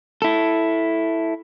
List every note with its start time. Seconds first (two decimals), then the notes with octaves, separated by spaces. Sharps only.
0.22 E4 A4